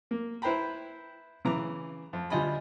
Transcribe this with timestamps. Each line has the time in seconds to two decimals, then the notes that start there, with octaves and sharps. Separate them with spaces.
0.11 A#3
0.42 E4 B4 C5 G5 A#5 B5
1.45 C#3 E3 A#5 D6
2.13 F2
2.30 D2 G3 F4 D#5 G#5 B5